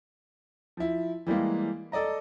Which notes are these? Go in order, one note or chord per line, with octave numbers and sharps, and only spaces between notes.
F3 E4
E3 G3 G#3 A#3
A4 D5 D#5 A#5